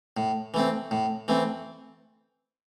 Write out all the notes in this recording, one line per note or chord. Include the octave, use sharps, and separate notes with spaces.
A2
E3 A3 C4
A2
E3 A3 C4